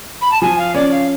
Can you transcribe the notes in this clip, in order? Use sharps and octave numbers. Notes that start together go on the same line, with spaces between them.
B5
A5
F3 G#5
F5
C#4 D5
F5